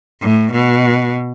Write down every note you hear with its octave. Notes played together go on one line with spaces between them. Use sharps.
A2
B2